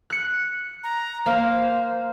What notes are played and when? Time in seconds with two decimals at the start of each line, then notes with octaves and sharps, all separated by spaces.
0.10 F#6 C#7
0.83 A#5
1.26 A#3 C5 F5